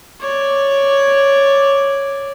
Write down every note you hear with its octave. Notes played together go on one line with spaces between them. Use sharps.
C#5 D5